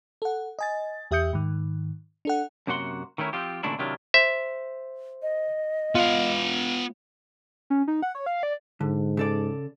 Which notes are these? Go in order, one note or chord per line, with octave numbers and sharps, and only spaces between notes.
A4 F#5
D#5 G#5 A6
E2 G4 E5 D#6 G6 C#7
G#2 D#3
D4 A4 F#5
F#2 C3 A#3 F#4 F#5 C6
D#3 A3 C#4 E4 A#4
F3 C4 F4 G4
D#2 A#2 C#3 A3 D4 E4
C3 D#3 F#3 D4 E4 F4
C5 E5
D#5
B3 F4 F5
C#4
D#4
F#5
C#5
F5
D5
G#2 D3
C#3 A4 D5